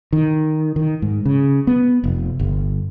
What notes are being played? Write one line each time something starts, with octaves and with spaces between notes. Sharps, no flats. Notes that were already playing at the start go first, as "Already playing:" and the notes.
D#3
D#3
G#2
C#3
B3
F1
G1